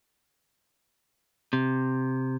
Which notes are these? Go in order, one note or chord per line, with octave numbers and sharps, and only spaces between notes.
C3